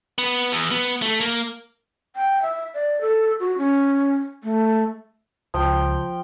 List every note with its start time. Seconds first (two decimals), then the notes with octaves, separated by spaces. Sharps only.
0.18 B3
0.52 E2
0.71 B3
1.02 A3
1.20 A#3
2.16 G5
2.42 E5
2.74 D5
3.01 A4
3.40 F#4
3.58 C#4
4.44 A3
5.54 C#2 F3 G5